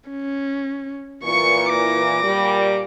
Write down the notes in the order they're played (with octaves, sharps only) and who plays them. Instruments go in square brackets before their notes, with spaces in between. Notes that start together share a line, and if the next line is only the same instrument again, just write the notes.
[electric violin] C#4
[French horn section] A#2 E3 [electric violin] C#6 C#7
[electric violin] D6 A#6
[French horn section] A#2 G3